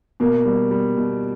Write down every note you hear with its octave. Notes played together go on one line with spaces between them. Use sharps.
B2 A#3
G3
G3
B2